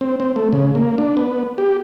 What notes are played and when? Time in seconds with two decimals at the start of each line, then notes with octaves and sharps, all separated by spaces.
0.01 C4
0.20 C4
0.36 A3
0.53 C#3
0.75 A#3
0.98 D4
1.17 B3
1.58 G4